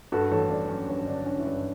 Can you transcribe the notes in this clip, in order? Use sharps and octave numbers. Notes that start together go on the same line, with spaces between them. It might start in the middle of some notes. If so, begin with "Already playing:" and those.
G2 F#4 A4
A1 A4 C#5
G2 D4
F#3 C#4
G2 C#4
D3 D4
D3 C#4
E4
G2 D4